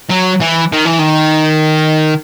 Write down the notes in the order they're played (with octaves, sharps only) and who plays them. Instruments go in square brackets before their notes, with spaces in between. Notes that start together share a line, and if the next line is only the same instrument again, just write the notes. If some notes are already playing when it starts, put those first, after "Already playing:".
[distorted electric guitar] F#3
E3
D#3
E3
D#3